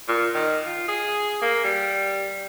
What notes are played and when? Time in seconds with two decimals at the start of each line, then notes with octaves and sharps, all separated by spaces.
0.08 A#2
0.35 D#3
0.66 F4
0.88 G#4
1.42 A#3
1.64 G3